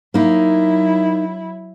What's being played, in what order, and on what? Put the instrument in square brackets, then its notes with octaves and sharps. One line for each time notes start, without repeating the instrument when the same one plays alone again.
[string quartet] F#3 E4 [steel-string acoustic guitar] A#3 D#4